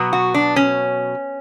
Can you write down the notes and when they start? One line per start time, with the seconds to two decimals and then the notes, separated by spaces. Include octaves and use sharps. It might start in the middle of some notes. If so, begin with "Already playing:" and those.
Already playing: B2 F#3 B3
0.13 F#4
0.34 D4
0.56 C#4